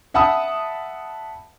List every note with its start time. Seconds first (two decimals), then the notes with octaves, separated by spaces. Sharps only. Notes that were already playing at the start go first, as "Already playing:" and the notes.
0.14 E5 F#5 A5 B5 D#6 E6